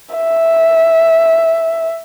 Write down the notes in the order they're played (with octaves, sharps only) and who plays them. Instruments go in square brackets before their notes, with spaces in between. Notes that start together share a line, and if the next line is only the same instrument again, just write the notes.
[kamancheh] E5